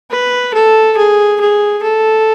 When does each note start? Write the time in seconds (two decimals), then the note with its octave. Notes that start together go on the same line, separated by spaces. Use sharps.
0.11 B4
0.54 A4
0.97 G#4
1.41 G#4
1.83 A4